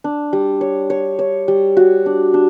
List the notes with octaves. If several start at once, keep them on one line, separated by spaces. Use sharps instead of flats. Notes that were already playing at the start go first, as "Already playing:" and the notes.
D4
G3
C#5
C#5
C#5
G3
F#4
D4
D4